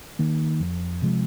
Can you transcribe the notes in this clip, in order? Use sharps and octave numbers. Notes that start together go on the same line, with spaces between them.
D#3 A#3
F2
C3 F3 G#3